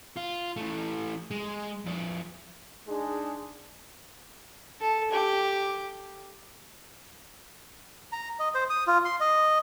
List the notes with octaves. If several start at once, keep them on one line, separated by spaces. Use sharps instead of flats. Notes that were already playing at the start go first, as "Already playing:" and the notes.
F4
E3 A3
G#3
F2 D5
G#3 D4 D#4 G#4
A4
G4
A#5
D#5
C5
D#6
F4
C6
D#5